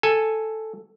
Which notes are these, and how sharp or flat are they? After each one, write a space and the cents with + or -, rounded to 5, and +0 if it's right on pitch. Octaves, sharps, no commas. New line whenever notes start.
A4 +0 G#5 +0